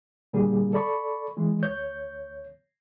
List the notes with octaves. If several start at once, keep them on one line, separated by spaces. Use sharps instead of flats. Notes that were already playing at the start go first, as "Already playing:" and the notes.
A#2 D3 G3 A#3 G#4
A4 D5 B5 C#6
E3 G#3
D2 C#5 G6